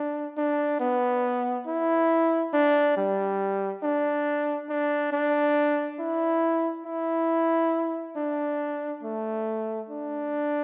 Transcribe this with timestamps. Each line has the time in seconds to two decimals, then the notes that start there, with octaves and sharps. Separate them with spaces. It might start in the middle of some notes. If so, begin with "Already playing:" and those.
Already playing: D4
0.37 D4
0.80 B3
1.67 E4
2.54 D4
2.97 G3
3.83 D4
4.70 D4
5.13 D4
6.00 E4
6.86 E4
8.17 D4
9.03 A3
9.89 D4